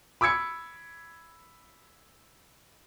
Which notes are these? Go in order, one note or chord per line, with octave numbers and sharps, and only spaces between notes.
B5 D6 E6 G#6 C#7